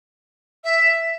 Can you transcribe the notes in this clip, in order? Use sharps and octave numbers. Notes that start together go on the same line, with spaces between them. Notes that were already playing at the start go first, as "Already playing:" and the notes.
E5